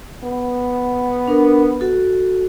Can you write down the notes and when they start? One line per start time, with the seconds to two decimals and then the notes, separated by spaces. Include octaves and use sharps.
0.24 B3
1.27 D4 A#4
1.81 F#4 A4